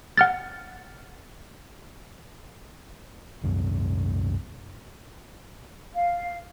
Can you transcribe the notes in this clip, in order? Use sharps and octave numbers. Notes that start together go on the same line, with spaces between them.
F#5 F6 A6
C2 F#2
F5